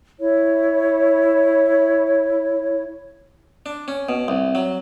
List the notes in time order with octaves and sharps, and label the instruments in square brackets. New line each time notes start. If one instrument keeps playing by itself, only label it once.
[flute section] E4 C#5
[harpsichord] D4
C#4
B2
C2
F#3